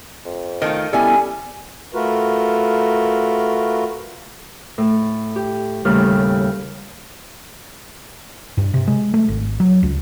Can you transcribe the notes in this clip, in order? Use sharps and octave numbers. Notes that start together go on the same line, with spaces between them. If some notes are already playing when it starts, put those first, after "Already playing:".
F2
D#3 A3 F4 A#4 D#5
G3 B3 C#4 E4 A4 E5 G#5
A3 F4 F#4 A#4 B4
A2 A4
G4
D#2 A2 C#3 G3 F6
G2
C3
G#3
A3
G#1
F#3
C#2